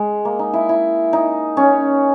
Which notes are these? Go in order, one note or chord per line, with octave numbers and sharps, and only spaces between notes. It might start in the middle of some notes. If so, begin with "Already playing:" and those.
Already playing: G#3
A#3
D#4
E4
E4
D#4
C#4